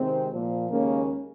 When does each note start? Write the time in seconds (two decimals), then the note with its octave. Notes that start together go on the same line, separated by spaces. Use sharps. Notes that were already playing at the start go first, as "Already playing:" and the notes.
Already playing: C3 D#3 G#3 C4
0.30 A#2 F3 A#3
0.69 D#2 C#3 G#3 A#3 C#4